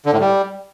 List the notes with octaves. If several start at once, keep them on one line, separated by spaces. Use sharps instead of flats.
D3
A2
G3